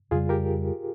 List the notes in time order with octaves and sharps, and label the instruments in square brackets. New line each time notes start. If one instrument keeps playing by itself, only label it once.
[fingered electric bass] F2 C#3 G3 [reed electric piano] F4 G#4
[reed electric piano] G4 A#4